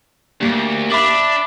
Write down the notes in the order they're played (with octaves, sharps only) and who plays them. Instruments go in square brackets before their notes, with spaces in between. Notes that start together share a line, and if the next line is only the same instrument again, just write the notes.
[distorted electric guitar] D2 [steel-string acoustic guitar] A#3 G4
[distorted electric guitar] D4 [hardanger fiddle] E5 [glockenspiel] B5 D6 F#7